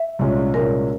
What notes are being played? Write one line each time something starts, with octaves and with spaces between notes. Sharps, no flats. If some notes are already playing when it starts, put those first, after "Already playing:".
Already playing: E5
C2 A#2 G#3 C#4
C2 A#2 G#3 C#4 A#4